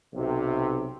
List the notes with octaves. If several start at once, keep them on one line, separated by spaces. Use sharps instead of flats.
B1 C3